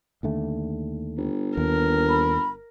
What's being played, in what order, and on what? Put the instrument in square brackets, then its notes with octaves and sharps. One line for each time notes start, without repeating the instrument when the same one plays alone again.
[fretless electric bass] D#2 D3 A3
[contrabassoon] G1
[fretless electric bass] D#2 [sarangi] A#4
[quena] B5